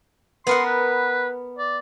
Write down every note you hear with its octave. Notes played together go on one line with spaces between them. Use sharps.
B3 A#4 F#5 C6
B4
D5